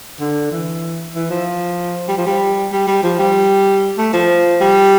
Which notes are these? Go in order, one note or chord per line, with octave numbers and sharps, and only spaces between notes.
D3
E3
E3
F3
G3
F3
G3
G3
G3
F3
G3
A3
F3
G3